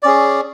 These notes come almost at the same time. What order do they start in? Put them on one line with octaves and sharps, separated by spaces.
D5 C#4 G#4